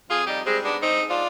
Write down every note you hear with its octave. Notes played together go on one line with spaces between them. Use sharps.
F2 F4 G#4
G3 D#4 G4
G3 G#3 C4
G#2 B3 D4
G#3 C4 D#4
G#2
D4 F4